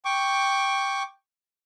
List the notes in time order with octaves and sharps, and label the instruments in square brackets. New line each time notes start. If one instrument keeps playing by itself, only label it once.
[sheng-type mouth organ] G5 C#6 D6